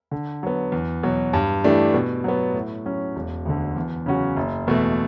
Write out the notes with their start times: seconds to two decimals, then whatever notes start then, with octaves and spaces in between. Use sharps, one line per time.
0.11 D3
0.43 F#3 B3
0.72 E2
1.03 B2 F#3
1.33 G2
1.64 E3 A3 D4 G4
1.94 B2
2.24 F#3 B3
2.54 A2
2.86 F#3 C#4
3.16 E1
3.45 D2 D3
3.77 E2
4.06 C#3 F#3 C#4 F#4
4.36 F#1
4.67 E2 B2 A3